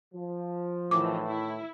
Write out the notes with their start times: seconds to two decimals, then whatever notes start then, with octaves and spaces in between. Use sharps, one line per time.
0.13 F3
0.91 A2 D#3 E3 D6
1.26 E4